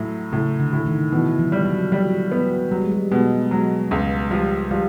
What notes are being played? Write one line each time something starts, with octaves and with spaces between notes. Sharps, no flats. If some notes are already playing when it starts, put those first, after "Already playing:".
Already playing: A2 F#3
A2 C#3
D3
A2
D#3
B2 E3
F3
G3
F#3
F#3 G3
B3
F#3 G3
G#3
G3
B2 G#3
F#3 G#3
C#2
F3 G3
F3 G3